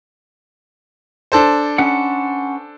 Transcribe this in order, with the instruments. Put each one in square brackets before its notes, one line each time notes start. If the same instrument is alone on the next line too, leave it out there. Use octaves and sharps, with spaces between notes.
[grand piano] D4 A4 C5
[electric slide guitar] C#4 B4 F#5